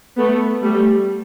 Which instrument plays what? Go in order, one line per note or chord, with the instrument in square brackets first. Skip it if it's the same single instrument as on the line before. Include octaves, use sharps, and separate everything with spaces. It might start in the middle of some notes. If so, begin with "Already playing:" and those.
[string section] A3 B3
G3 A3